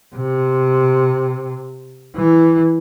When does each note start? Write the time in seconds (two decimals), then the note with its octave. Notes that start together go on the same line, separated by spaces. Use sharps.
0.15 C3
2.16 E3